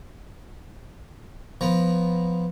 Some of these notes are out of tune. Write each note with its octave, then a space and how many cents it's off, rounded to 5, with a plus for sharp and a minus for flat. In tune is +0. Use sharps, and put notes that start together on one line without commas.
F3 +0 B3 +0 A#5 +0